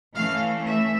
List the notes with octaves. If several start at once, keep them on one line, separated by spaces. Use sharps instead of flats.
E3 A3 C#4 F5
E5